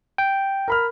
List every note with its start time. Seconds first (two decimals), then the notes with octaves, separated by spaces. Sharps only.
0.18 G5
0.68 A#4 B5 F6